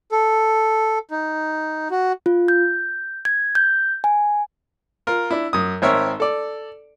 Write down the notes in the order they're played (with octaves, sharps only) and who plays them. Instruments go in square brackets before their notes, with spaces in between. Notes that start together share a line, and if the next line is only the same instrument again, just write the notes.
[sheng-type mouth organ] A4
D#4
F#4
[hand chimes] F4
G6
G#6
G6
G#5
[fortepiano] F4 A#4
D4 E4
F#2 D#6
G#1 C4 A#4 C#5 E5 E6
A4 D5